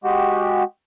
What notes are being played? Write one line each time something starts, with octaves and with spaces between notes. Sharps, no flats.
G#3 F#4 G4